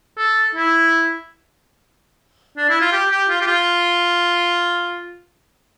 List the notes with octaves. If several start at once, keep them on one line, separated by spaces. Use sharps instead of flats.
A4
E4
D4
E4
F4
G4
G4
F4
G4
F4